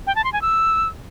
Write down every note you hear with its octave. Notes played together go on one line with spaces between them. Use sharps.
G5
A5
C6
G#5
E6